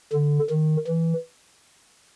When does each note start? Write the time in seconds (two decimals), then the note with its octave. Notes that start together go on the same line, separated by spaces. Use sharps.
0.13 D3
0.50 D#3
0.87 E3